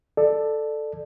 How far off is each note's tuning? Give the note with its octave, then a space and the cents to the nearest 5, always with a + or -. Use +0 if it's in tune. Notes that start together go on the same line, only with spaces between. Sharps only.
A4 +0 D5 +20